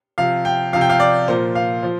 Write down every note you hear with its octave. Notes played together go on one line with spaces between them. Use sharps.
C3 F3 F5
G5
C3 F3 F5
G5
F5
D5
A#2 F3 C5
F5
F3 C5